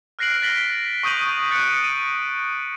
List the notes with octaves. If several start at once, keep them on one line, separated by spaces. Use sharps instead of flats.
F6 F#6 A#6 C7 D7 F#7
F#6 A6 B6 F#7 G7
C#6 D#6 G6 D#7 F#7
F#6 A6 C#7 D7
D#7